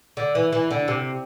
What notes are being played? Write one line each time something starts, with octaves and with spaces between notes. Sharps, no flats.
D3
E3
E3
D3
C3